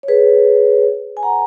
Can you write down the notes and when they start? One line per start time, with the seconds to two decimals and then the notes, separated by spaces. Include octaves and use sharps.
0.03 C#5
0.08 G#4 B4
1.17 G#5
1.23 F#5 A#5